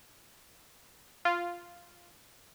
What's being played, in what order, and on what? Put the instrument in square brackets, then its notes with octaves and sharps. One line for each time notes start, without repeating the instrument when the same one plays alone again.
[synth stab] F4